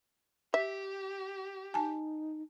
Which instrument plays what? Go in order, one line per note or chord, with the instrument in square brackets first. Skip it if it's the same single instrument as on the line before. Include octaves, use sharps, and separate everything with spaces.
[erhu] G4 [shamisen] E5
[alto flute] D#4 [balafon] G#5 A5